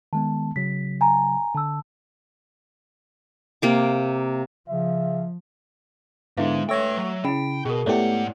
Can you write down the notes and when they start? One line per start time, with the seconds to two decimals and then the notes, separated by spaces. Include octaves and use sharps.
0.13 D#3 G#3 B3 A5
0.56 C#3 F#3 B6
1.01 G#5 A#5
1.55 D3 A5 E6
3.62 C3 A#3 D6
4.69 C#3 F3 E5
6.37 G#2 D3 G#3 B3 E4 E5 F5
6.69 A3 B4 C#5 E5 G5 E6 A#6
6.97 F#3
7.25 C#3 E4 G5 B5
7.65 B2 G#4 A#4
7.86 G#2 A3 B3 E4 G4 C#5 D5 F#5